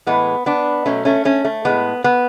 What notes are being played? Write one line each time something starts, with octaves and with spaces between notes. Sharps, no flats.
A2 E3 G#3 B3
B3 D4
B2 F#3 A3 C#4
A3 C#4
A3 C#4
A3
A2 G#3 B3
B3